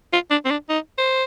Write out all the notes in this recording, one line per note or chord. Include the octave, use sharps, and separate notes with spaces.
F4
D4
C4
D4
D#4
C5